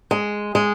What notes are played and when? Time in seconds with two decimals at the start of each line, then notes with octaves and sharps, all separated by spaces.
0.11 G#3
0.55 G#3